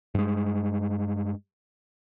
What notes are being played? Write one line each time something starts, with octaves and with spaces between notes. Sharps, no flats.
G2 G#3